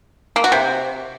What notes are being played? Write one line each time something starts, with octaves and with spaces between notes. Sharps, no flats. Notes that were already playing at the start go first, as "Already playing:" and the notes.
A#3
F#4
C3